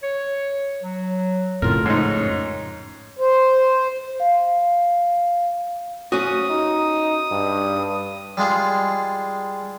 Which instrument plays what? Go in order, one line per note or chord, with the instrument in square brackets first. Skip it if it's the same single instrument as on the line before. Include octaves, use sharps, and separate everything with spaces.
[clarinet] C#5
F#3
[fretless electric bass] F2 A2 C#3 [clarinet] F4 [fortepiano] A#4
[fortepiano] G#2 D#4 [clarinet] C#5
[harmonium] C5
[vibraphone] F5
[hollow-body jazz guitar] C#4 F#4 [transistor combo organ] D#6
[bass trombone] D#4
G2
[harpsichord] G3 G#3 F4 G#4